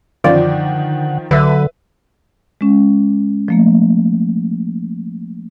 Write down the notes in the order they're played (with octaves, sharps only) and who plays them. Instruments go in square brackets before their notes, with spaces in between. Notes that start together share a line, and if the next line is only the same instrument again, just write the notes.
[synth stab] F#2 F4 D5 [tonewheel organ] D3 F#5 [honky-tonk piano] D#3 F3
[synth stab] C2 [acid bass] D3 [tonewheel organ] F#3 [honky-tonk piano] B4 E5
[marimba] G#3 C#4
F3 A3 A#3